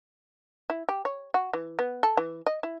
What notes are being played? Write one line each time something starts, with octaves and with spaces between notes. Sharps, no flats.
E4
G4
C#5
F#4
E3
B3
A4
E3
D#5
E4